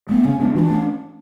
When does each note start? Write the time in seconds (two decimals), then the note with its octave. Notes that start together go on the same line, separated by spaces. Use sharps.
0.09 G#3 A3 B3
0.24 C#3 C#4
0.40 G#3 B3 D4
0.55 E3 D4 F#4
0.70 A3 C#4